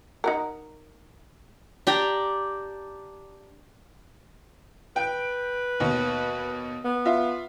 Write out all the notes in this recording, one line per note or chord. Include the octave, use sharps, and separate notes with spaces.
D#4 F#4 A#4
D4 G4 G5 A#5
B4 G5 D7
D#2 B2
B3
F4 E5